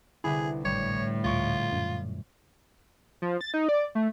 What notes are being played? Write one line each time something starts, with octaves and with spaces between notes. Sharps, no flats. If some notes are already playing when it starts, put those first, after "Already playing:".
C2 D3 E4 G#4 B4
G#1 A2 G3 C#5
D2 A#2 F4 C#6 D7
F#2
F3
A6
D#4
D5
A3